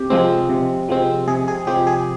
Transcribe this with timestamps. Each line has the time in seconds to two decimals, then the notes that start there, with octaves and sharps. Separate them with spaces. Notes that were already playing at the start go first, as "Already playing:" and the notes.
Already playing: C3 G4
0.10 F3 G#3 C4
0.49 C3
0.89 F3 G#3 C4
1.28 C3 G#4
1.48 G#4
1.67 F3 G#3 C4 G4
1.87 G#4